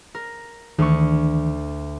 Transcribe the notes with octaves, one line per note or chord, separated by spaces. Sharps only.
A#4
D2 D#3 E3 C#6